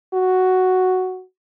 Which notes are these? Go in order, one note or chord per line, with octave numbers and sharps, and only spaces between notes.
F#4